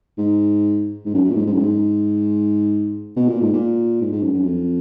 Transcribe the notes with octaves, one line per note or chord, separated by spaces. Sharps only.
G#2
G#2
F#2
F#2
A#2
G#2
G#2
F#2
G#2
B2
A#2
G#2
A#2
G#2
G#2
F#2
F#2
F2